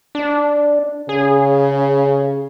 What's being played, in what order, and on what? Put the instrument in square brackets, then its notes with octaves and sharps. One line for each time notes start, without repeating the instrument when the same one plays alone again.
[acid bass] D4
[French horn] C#3 [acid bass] G#4